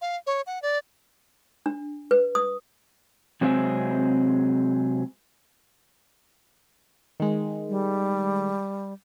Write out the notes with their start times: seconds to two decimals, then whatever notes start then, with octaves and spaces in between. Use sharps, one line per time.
0.01 F5
0.27 C#5
0.47 F#5
0.62 D5
1.66 D4
2.11 B4
2.35 D#6
3.41 C3 F#3 G#3 C4 G#4 E5
7.20 D#3 G#3
7.69 G3